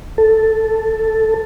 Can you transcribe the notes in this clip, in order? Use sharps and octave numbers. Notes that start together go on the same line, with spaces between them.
A4